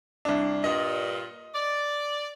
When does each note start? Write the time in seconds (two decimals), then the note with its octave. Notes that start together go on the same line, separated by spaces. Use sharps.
0.25 C2 D4
0.64 G2 A#2 D#5
1.55 D5